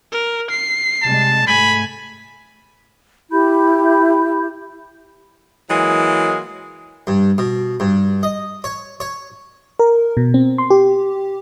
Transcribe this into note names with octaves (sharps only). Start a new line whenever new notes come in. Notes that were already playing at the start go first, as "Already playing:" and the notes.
A#4
C7
C3 G3 G#3 A5
G#2 A3 G#5 B5
E4 G4 B5 G6
E3 F#3 G#3 A#3
G2
B2
G2
D#5
C#5
C#5
A#4
B2
C4
C6
G4